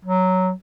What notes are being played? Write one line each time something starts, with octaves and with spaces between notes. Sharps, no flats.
F#3